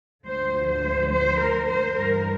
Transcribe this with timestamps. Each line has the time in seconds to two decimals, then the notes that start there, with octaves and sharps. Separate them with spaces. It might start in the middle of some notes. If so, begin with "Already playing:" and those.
0.25 D2 D3 F3 C5
0.69 C5
1.10 C5
1.40 A#4
1.67 C5
1.96 G2 E3 G3 A#4